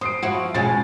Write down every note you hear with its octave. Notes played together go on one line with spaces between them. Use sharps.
C5 D#6 C7 D7
F3 E4 F#4
B2 G#3 C#4 G#5 A6